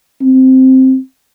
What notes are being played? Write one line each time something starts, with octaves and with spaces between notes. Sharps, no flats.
C4